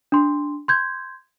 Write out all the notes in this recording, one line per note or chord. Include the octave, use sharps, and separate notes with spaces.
D4 C6
C6 G6 G#6